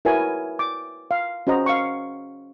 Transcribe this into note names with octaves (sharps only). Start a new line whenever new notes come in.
E4 F#4 A#4 B4 C#5 G#5
D6
F5
C#4 F#4 C5 D#5 A#5
F5 C#6